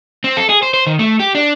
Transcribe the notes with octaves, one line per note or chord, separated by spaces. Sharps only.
C4
A4
G#4
C5
C5
D#3
A3
G4
D4